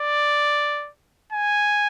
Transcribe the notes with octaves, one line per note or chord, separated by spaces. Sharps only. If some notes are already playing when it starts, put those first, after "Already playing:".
Already playing: D5
G#5